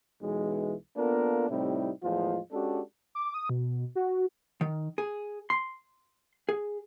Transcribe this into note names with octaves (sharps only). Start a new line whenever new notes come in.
B1 E3 G#3
A#3 B3 D4 F4 A4 A#4
A2 C3 G3 C4 D#4 E4
E2 A2 F3 G#3 F4
G#3 C#4 D4 F#4 G4 A4
D6
D#6
B2
F#4
D#3
G#4
C6
G#4